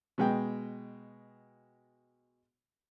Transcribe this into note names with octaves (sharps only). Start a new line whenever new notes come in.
B2 G#3 G5